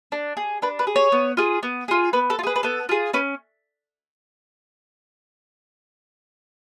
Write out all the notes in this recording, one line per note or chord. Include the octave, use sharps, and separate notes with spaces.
D4
G#4
D4 B4
B4
G#4
C#5
B3
F4 G#4
B3
F4 G#4
B3 B4
A4
F4
G#4 B4
B4
B3 A4
F4 G#4
C#4 B4